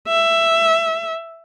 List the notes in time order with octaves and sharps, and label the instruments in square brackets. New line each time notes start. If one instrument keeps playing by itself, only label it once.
[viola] E5